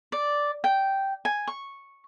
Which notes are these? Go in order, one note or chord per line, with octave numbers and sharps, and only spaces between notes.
D5
G5
G#5
C#6